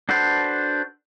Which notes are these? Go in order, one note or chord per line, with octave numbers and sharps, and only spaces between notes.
D4 F#4 A4 B4 C5